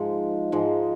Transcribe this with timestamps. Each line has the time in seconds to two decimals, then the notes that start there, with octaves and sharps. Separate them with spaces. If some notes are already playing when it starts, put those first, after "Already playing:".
Already playing: G#2 F3 G#3
0.52 G#2 F3 G#3